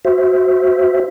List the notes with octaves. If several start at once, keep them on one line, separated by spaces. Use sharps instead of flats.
F#4 C5 E5